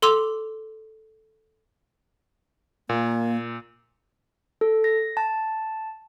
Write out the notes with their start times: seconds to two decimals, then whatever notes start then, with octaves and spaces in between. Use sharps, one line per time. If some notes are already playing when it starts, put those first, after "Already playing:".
0.02 A4 C6 D6 E6 F7
2.89 A#2 A#3
4.61 A4
4.84 A#6
5.17 A5